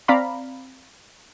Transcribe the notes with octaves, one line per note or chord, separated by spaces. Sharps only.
C4 D5 F5 A#5 B5